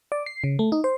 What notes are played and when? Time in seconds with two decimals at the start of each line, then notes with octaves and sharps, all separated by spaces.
0.12 D5
0.26 C7
0.44 C#3
0.59 A3
0.72 D#4
0.84 C5